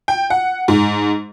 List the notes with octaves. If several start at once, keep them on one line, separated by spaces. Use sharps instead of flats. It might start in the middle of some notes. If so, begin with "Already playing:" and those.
G5
F#5
G#2